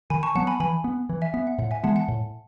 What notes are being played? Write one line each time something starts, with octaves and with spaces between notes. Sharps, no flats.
D#3 G#5 B5
A5 C#6
F#3 B3 F#5 A5
G#5 B5
E3 G#5 B5
B3
E3
E5 G#5
B3 E5
F#5
A2 F#5
E5 G#5
E3 G#3 B3 F#5 A5
F#5 A5
A2